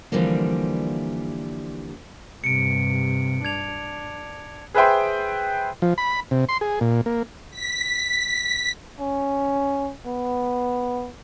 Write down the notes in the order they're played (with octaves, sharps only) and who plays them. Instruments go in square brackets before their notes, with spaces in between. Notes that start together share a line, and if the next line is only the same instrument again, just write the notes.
[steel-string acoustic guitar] D3 E3 F3 G3 A#3
[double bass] G2 C3 [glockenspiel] C#7 D7
[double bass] D4 [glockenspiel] G#6 F7
[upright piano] G#4 B4 C5 E5 G5 C6
[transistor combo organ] F3
B5
C3
C6
G#4
A#2
A#3
[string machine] B6
[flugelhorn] C#4
B3